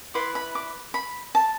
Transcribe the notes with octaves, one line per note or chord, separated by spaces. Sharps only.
E4 B4 D5 C6
B5
D6
B5
A5